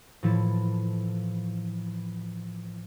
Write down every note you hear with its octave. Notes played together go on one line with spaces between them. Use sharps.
A2 E3 F3 E4 A4